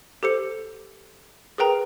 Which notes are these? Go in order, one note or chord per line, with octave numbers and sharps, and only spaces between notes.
G4 A4 C5 C#7
G#4 A#4 B4 G5 A#5